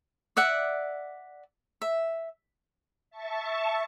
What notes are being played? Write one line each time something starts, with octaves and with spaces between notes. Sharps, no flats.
D5 E5 F#5
E5
E5 A5 C#6